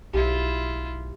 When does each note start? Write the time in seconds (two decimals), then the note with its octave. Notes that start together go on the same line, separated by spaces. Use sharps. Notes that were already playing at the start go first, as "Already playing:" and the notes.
0.14 B1 E4 F4 G4